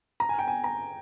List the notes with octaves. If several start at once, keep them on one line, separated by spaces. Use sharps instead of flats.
A#5
G#5
G5
G#5
A#5